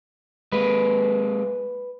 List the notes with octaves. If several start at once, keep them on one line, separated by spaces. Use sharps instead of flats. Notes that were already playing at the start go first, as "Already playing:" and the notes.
G#3 A#3 B4